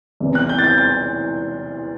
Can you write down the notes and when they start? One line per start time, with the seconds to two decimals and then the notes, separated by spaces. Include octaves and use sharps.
0.20 E2 C3 E3
0.35 F#6
0.49 G6
0.59 A6
0.64 G6
0.78 A6